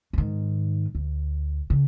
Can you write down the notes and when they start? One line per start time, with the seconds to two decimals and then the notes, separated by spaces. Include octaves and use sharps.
0.13 G#2 D#3
0.95 D2
1.70 C#3